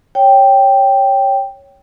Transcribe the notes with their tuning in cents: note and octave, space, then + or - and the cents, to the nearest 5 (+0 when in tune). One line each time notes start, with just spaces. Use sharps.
C#5 +0 G5 +0